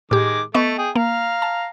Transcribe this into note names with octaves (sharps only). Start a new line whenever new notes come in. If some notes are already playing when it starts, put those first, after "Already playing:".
A2 D#3 G#3 G4 D6
A3 B3 D#5 C#6
G#4 G5
A#3 F5 A#5
A5